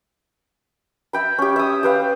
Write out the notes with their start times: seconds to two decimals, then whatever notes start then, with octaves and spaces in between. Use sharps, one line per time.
1.13 E5 G5 B5
1.38 C#4 G4
1.56 E5 D#6
1.83 G4 B4 F5